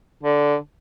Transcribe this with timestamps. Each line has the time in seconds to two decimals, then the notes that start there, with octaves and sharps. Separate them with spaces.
0.23 D3